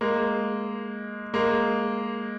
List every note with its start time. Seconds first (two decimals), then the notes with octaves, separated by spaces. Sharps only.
0.01 G#3 A#3
1.34 G#3 A#3